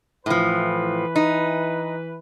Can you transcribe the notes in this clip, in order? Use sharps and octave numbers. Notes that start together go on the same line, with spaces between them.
A2 E3 F3 B4
D#4